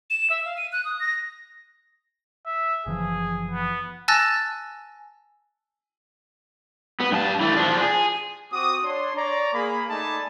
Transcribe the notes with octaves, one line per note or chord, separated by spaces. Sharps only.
E7
E5
F5
D#7
F#6
D#6
A#6
E5
F#1 E3 F3 G#4
B3
G#5 A5 E6 F#6 A6 A#6
B3
G2 A5
E3 A3
F3 D4
G#4
C4 F#4 D6 D#6
D4 C#5 C6
C#5 D5 A#5
A#3 G#4 B5
A3 D#4 D5 G#5 A5 B5